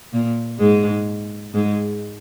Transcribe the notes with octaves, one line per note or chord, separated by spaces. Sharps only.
A#2 A#3
G#2 G#3
G#2 G#3